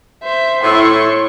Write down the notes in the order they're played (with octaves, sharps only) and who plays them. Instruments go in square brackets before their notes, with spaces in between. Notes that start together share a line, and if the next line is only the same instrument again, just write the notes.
[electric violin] C5 E5
[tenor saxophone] A2 [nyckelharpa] E4 [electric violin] C6 C#6